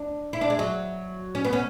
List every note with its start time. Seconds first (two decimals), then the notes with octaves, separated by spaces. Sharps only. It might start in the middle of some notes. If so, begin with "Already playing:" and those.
Already playing: D4
0.33 E4
0.41 D4
0.50 G#3
0.59 F#3
1.35 C#4
1.45 B3
1.53 C#4